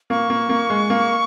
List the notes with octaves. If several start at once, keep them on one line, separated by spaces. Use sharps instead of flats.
A#3 C#6
A#3
A#3
G#3
A#3